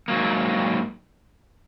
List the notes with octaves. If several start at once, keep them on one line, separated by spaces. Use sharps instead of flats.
G#2 F#3 A#3